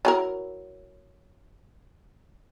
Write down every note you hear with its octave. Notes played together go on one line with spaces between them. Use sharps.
F#3 E4 A#4